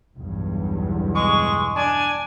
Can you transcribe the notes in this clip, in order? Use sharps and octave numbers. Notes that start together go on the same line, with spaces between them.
B1 E2 G2
G#3 C#6
D4 G#5